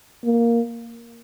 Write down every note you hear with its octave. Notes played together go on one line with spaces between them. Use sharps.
A#3